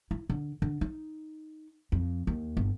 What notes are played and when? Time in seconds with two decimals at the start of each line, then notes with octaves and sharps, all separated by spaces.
0.11 E4
0.29 D3
0.62 D3
0.81 D#4
1.92 F2
2.27 D#2
2.57 G1